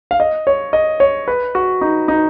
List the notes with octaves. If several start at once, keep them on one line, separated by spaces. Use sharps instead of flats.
F5
D#5
C#5
D#5
C#5
B4
F#4
D#4
D#4